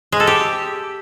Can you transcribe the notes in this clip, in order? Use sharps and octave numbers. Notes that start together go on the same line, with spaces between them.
G#3
A4
G4